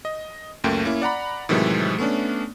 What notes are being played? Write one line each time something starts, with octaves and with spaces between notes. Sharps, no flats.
D#5
C#2 F#2 A3 A#3 G5
A#3 C#4 E4
D5 F#5 A#5 B5
A2 C3 D#3 E3 F#3 G#3
A3 B3 C#4 D4